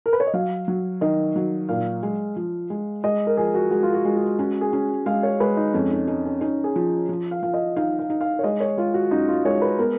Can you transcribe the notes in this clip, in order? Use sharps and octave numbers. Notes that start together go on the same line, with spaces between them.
A#4
B4
C#5
D#5
F#3 F5
F#3
D#3 D#5
F#3
A#2 F5
G#3
F3
G#3
G#3 D#5
A#4
F3 G#4
F#4
G#3 F#4
F4
F#4
G#3
F#4
C#4 F#4
G#4
C#4
G#3 F5
C#5
G#3 B4
D#4
F2 C#4
D#4
C#4 D#4
C#4
C#4 D#4
G#4
F3
F3
F5
F3 F5
D#5
D#4 F5
F5
D#4
F5
C#5
G#3 D#5
C#5
G#3 F4
F#4
F#2 D#4
F4
G#3 C#5
B4
B3 A#4